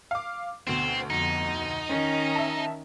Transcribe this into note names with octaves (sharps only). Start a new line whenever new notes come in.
F5 D6
D2 B2 C4
F2 D#4
D#3 C#4
E5 A5